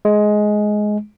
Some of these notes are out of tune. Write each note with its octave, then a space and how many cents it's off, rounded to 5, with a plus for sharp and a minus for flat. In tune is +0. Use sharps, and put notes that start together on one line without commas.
G#3 +15